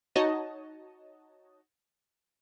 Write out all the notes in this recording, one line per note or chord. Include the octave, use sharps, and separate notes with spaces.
D#4 F#4 C#5 D#5 A5